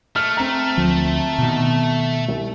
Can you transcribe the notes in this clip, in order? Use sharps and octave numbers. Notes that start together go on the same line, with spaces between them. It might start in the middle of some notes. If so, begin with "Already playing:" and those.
A3 F6
C4 A#5
D2 F3
B2 D#3
C2